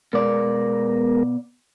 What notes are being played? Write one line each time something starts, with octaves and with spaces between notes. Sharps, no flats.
B2 G#3 B3 A#4 D5